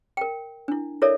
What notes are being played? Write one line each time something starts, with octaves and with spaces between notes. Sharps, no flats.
A#4 G5
D4 E4
E4 A4 A#4 C#5 D5 E5